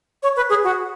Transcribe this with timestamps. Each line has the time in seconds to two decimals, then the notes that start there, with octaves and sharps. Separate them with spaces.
0.23 C#5
0.36 B4
0.50 G#4
0.64 F#4